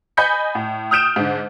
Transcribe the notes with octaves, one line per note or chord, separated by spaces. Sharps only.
D#5 G#5 B5 G6 B6 C#7
A2
D#6 F6 G6 D7 E7
G#2 D3